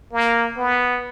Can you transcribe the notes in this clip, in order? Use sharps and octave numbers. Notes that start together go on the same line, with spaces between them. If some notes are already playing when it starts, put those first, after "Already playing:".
A#3
B3